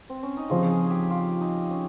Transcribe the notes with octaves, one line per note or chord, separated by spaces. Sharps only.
C4
C#4
D#4
C#3 F3 C4 F4
G#4
G4 G#4
F4
D#4
C#4